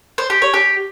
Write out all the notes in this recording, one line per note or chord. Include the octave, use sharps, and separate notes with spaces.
C5
G4
C#5
G4